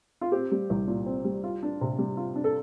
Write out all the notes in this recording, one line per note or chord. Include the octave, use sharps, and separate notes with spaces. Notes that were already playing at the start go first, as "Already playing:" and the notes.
F4
C4 G4
G3
C2
A#2
C4
G3
F4
D4
C3
G3
F4
D4
A4